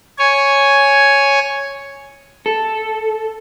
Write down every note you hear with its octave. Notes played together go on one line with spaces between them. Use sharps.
C#5 G#5
A4